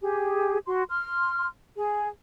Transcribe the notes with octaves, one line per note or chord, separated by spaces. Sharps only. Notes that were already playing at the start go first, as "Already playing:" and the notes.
G4 G#4
F#4 C6
C6 F6
G#4